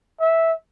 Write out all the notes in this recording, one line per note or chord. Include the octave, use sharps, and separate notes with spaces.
E5